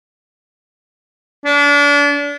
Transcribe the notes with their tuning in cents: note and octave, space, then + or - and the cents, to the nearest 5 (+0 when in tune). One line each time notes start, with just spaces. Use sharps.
D4 -35